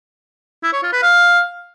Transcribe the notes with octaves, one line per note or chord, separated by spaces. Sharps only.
E4
C#5
F4
B4
F5